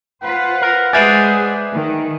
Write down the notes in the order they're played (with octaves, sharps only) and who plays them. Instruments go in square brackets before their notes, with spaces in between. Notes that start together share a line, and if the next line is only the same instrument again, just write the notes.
[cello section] F4 B4 C5 [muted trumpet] F#5
[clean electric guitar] A#4
[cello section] G#3 G#4 [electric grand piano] B4 E5 G#5 [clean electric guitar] C5 D5
[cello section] D#3